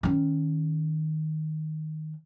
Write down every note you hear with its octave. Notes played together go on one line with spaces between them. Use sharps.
D#3 C#4